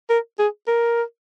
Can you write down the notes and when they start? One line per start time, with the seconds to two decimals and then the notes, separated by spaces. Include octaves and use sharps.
0.10 A#4
0.39 G#4
0.68 A#4